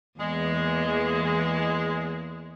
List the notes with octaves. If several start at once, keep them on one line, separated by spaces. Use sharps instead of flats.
E2 E3 G#3 A#3